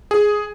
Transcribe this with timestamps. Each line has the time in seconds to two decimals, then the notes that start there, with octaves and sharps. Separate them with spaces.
0.11 G#4